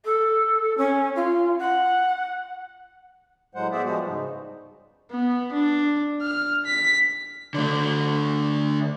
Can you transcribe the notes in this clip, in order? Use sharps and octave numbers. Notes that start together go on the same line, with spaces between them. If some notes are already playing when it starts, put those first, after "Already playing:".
A4
C#4
F4
F#5
A2 F#3 G#3 C5 F#5
B3 G#4 C5 D5 E5
F3 G3 G#3 B3 F#4
G#2 C#3 D#4
B3
D4
F6
B6
D3 A3